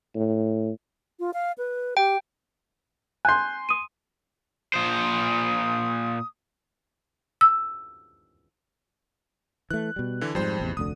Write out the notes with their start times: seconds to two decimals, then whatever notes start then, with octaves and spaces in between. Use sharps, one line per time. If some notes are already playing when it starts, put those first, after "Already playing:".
0.15 A2
1.20 F4
1.34 F5
1.58 B4
1.97 G4 G5
3.25 G#5 C6 F#6 G6
3.69 D#6 D#7
4.74 A#2 C5 D#6
7.41 E6
9.71 E3 A3 F#6
9.96 B2 G3
10.21 D3 E3
10.35 F2 G#2 F3 G3 C5
10.60 A1 E2 C3
10.77 F1 D2 D3 D#6